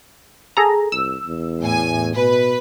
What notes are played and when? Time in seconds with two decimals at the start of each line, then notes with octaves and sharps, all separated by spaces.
0.57 G#4 A4 A#5
0.92 C2 E6
1.26 E2
1.61 A2 G#5
2.16 B2 B4